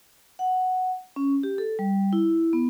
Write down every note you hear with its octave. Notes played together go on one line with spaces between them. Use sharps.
F#5
C#4
G4
A4
G3
E4
B3